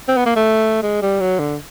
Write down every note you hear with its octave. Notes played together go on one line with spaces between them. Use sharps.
C4
B3
A#3
A3
G#3
G3
F#3
D3